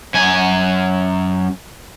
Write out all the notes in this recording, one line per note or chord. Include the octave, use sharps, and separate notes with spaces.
F#2 G#5